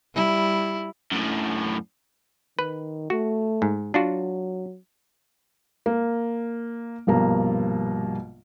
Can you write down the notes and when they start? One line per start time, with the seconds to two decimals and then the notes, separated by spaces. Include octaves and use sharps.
0.15 G3 E4
1.12 F#2 A2
2.59 D#3 B4
3.10 A3 F#4
3.62 G#2
3.94 F#3 D4 F4 F#4
5.86 A#3
7.07 A#1 G2 B2 A#3 A#5